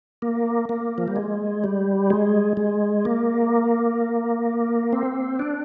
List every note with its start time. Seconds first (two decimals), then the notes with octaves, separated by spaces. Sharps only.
0.22 A#3
0.69 A#3
0.98 F3
1.08 G3
1.16 G#3
1.64 G3
2.10 G#3
2.57 G#3
3.05 A#3
4.93 C4
5.39 D4